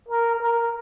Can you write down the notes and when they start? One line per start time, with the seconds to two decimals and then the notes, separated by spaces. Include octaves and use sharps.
0.09 A#4
0.40 A#4